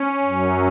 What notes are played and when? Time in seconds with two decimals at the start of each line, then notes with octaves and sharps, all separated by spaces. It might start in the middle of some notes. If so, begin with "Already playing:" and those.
Already playing: C#4
0.23 F#2 F#3